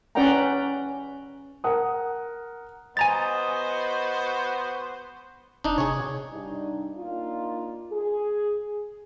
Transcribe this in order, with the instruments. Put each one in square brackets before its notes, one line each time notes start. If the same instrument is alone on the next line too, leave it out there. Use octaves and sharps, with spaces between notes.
[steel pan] C#4 B4 D5 F#5 G5 A#5
[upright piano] A#4 F#5 D#6
[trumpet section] B3 F#4 C5 [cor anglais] D#5 [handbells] G#5 A#5 A6
[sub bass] F1 [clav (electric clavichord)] D4 D#4
[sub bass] C3 [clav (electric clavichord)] G#4 C#5
[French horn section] G2 D4 D#4
A#3 D4 D#4 F4
G#4